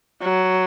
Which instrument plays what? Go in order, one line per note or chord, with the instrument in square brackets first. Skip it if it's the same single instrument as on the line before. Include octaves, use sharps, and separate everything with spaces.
[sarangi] F#3